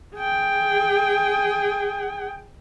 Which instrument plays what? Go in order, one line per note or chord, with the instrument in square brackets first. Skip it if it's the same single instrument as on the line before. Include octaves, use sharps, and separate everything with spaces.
[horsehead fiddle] G#4 G5